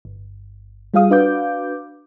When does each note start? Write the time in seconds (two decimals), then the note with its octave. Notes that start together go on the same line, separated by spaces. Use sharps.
0.05 G1
0.94 G3 F4 G#4 F5 D#6
1.10 D4 F#4 B4 F5 D6 G6